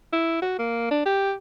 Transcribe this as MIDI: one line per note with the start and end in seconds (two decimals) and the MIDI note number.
0.13 0.40 64
0.42 0.55 66
0.58 0.88 58
0.91 1.01 62
1.06 1.33 67